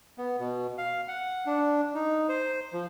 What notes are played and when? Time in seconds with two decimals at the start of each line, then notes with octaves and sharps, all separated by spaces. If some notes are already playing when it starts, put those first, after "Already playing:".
0.18 B3
0.39 B2
0.78 F5
1.08 F#5
1.46 D4
1.95 D#4
2.29 C5
2.73 F3